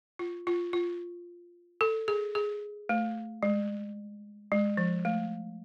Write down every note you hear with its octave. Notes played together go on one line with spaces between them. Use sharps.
F4
F4
F4
A4
G#4
G#4
A3
G#3
G#3
F3
A3